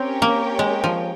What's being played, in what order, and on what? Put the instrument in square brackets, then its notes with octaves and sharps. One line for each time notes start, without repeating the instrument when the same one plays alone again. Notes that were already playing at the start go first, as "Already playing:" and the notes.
Already playing: [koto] C4 [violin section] C#4 G4 A#4 C#5 G5
[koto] A#3
G#3
F3